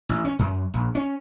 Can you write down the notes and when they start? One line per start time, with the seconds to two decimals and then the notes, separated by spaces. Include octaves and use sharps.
0.09 A1
0.25 C#4
0.39 F#2
0.74 A#1
0.95 C#4